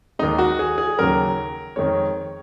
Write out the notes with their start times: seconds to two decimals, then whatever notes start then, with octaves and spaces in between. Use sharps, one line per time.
0.19 D#2 D#3 G#3 D#4
0.38 F#4
0.59 G#4
0.78 G#4
0.99 D#2 C#3 F#3 A#4
1.76 F2 D#3 G#3 C#5